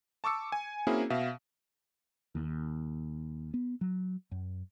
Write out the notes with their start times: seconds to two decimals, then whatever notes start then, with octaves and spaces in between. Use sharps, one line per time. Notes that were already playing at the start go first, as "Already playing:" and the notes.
0.24 A5 C#6 D6 E6 C#7
0.52 G#5
0.87 A#3 C4 C#4 E4 F#4 G#4
1.10 B2 E5 F5
2.35 D#2
3.54 B3
3.81 F#3
4.31 F#2